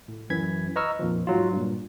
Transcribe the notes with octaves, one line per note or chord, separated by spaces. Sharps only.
A2
F#2 E3 G#6 B6
B4 D#5 A#5 C#6 E6 F6
F2 A#2 D#3 F3
G#2 F#3 F4
G2 A#2